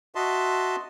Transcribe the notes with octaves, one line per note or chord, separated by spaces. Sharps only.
F#4 D#5 E5 A5 C6